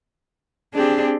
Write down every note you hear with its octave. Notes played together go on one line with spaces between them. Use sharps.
C4 D4 G4 G#4